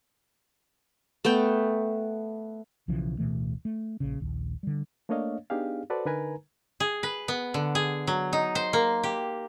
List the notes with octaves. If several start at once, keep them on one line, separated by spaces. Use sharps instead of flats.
A3 B3 G5
B1 C#3 E3 F3
D1 B2 E3 A3
A3
A#1 C#3
A#1 D#2
D3 G3
A3 A#3 D4 C#5 D#5 F5
B3 D4 D#4 G4 G#4 F5
F#4 A4 B4 C5 D5 A5
D3 D#4 A#4 B4 G#5 A#5
G#4
B4
B3
D3
G#4
F#3
D#4
C5
A#3
G4